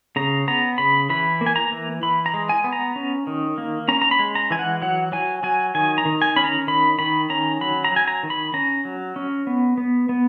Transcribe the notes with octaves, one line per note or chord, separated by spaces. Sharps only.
C#3 A#5
B3 A#5
C#3 B5
E3 B5
A#3
G#5
A#5
E3
E3 B5
A#5
G#3
G#5
B3
A#5
C#4
D#3
A#3
C#4 A#5
A#5
B5
G#3
A#5
E3 G#5
F#5
F#3 F#5
F#3 G#5
F#3 G#5
D#3 G#5
A#5
D#3
G#5
C#4 B5
A#5
D#3 B5
D#3 B5
C#4 A#5
F#3 B5
A#5
F#3 G#5
A#5
D#3
B5
C#4 A#5
F#3
C#4
B3
B3
B3